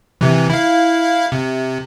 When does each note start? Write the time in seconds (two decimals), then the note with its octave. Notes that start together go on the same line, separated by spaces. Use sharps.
0.21 C3 E3
0.50 E4 F5
1.32 C3